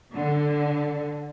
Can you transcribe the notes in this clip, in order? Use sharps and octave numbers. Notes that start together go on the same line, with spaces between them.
D3